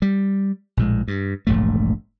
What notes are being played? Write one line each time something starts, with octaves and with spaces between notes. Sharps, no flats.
G3
A#1 A2 G#3
G2
E1 A#1 G#2 A3